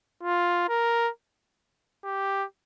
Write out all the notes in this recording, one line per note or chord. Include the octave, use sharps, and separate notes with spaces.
F4
A#4
G4